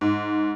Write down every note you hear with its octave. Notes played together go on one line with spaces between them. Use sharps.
G#2